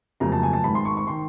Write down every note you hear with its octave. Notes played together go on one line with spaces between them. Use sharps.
F1 F2 C#3 F#3 A#3 A#5
A5
G#5
A5
G#1 G#2 D#3 B5
C6
C#6
C#6
D#3 C6